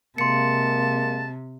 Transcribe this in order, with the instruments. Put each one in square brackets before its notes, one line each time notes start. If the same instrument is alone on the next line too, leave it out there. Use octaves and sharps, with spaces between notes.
[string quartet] C3 [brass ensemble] G#3 A#3 [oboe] A5 [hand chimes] C6 C#7